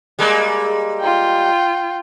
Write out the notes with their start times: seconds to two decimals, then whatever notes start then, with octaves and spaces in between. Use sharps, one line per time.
0.19 G3 G#3 A#3
1.00 F4 G5